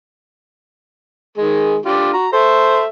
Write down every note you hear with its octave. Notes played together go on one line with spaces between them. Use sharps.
D#3 G#3 G#4
D4 F4 G4
F#4 A#5
A4 C5 E5